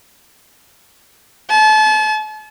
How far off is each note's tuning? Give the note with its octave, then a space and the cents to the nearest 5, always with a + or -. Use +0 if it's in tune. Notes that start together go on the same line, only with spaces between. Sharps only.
A5 -35